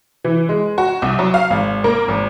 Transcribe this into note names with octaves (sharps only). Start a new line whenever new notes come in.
E3
G#3
F#4
C2
F#3
F5
G#1
A#3
G#1